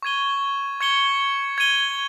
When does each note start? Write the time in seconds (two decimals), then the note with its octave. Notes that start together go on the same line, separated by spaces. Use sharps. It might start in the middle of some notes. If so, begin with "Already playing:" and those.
0.02 C#6 G#6 D#7 G7
0.81 C#6 G#6 C#7 G7
1.58 G#6 D#7 G7